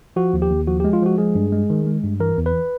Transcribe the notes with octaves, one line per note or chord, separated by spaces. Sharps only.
F3 F#4
D#2
G4
D#2
F3 F#4
G4
G#3
F4
F3 F#4
G#3 G#4
G2
G#3
D#3
G#3
G2
E3 A#4
E2
B4